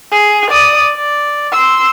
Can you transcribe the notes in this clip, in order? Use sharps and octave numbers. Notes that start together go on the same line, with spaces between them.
G#4
D5 D#6
D5
C6 E6